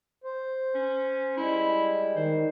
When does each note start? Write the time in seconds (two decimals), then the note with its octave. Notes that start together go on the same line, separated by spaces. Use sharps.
0.24 C5
0.75 C#4
1.37 G3 G#3 E4
2.16 D#3 C5